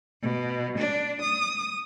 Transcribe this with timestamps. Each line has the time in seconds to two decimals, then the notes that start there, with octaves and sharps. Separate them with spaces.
0.22 B2
0.78 D4
1.21 D#6